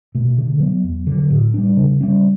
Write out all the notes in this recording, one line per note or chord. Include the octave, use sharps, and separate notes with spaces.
B2 A3
D3
F#3 B3
E2
D3 F#3
A2
G3 D4
C#3
G3 C#4